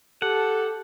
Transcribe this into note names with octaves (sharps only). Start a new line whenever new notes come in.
G4 A4 F#5